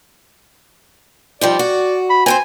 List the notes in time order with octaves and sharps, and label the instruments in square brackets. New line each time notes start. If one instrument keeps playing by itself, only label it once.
[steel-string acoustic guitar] G#2 F3 G3 [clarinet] D5
[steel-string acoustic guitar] F#4
[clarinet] B5
[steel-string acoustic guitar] C4 A4 C5 [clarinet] G#5